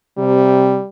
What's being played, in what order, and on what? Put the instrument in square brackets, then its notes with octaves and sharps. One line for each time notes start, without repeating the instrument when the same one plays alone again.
[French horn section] C3 [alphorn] G3